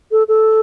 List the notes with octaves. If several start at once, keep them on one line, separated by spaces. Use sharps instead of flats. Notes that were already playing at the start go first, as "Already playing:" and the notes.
A4
A4